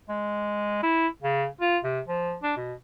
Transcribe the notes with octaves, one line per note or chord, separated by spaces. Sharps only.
G#3
E4
C#3
F4
C3
F3
D4
B2